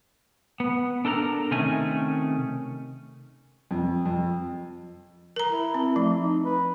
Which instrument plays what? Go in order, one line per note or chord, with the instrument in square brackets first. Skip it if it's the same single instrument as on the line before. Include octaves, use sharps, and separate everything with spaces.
[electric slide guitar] B3
D4 A4 A#4 F#5 A#5
C3 D#3 A3 C#4 G#5
[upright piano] F2
F2
[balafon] A#4 A#5
[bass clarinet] E4
[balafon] C4
[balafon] F3 [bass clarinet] A3
[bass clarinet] D#4
B4